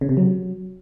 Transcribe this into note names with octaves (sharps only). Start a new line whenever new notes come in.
C#3
C3
F#3